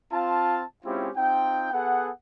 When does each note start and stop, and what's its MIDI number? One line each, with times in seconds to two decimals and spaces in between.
0.12 0.62 60
0.12 0.62 65
0.12 0.62 77
0.12 0.62 81
0.84 1.09 56
0.84 1.09 60
0.84 1.09 61
0.84 1.09 64
0.84 1.09 65
0.84 1.09 67
1.17 1.70 60
1.17 1.70 63
1.17 1.70 65
1.17 1.70 79
1.72 2.10 59
1.72 2.10 68
1.72 2.10 69
1.72 2.10 78